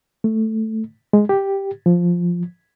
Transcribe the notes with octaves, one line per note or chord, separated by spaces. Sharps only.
A3
G#3
G4
F3